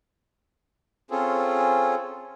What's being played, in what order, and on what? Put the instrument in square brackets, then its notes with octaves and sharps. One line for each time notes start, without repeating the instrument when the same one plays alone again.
[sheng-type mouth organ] C4 C#4 F4 G#4 A4